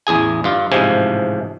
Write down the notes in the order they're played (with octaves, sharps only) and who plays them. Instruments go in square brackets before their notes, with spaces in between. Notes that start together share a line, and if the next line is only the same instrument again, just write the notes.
[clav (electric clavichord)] A1 E2 G#4 G#5
G2 F4
A1 G#2 C3 F3 G#5